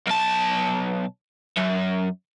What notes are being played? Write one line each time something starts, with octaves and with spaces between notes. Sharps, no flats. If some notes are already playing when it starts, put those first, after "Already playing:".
B1 A5
F#2